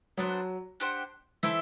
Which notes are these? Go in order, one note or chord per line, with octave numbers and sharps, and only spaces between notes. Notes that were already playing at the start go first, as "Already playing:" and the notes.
F#3 B3 D4 F#4 C5
D4 G4 C5 F#5
E3 E4 A4 C5 E5